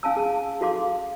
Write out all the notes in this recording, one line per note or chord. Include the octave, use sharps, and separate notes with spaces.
C#4 F5 G#5 A5 E6
G#4 A5
F#4 A4 F5 C6 D6